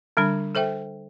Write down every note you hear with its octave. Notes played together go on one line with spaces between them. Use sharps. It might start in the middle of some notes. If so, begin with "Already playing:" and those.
D3 G3 D4 B5
A4 C5 E5 G5